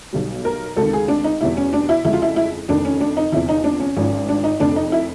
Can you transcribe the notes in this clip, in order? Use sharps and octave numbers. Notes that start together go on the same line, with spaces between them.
B1 B2 G3
A#4
C#2 C3 D#3 A4
G#4
D4
D#4
E2 B2 G3 E4
C#4
D4
E4
F2 C#3 F3 G#3 E4
F4
E4
E4
F1 F2 C3 D#3 D4
C#4
D4
D#4
E2 C3 F3 E4
D#4
D4
C#4
G#1 G#2 F3 C#4
D4
D#4
F1 F2 C3 D4
D#4
E4